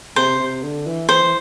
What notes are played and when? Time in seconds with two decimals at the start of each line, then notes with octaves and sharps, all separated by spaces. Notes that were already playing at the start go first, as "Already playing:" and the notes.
0.16 C3 C5
0.39 C3
0.63 D3
0.86 E3
1.09 E3 C5
1.23 E3